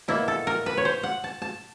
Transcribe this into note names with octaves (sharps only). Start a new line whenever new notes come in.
B2 F#3 A#3 E4
A4
A#4
B4
C#5
C5
F#5
A5
A5